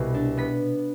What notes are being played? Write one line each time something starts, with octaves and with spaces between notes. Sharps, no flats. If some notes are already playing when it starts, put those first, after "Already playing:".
Already playing: C2 B2 B3
D4
B3 B6